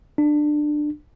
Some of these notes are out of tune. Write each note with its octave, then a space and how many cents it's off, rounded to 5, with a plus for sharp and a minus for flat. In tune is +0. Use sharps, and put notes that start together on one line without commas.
D4 +20